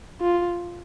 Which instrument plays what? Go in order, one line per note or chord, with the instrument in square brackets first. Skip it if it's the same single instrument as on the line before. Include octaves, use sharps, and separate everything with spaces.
[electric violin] F4